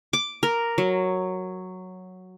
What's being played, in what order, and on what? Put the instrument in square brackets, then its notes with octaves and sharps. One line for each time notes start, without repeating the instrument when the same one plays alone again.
[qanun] D6
A#4
F#3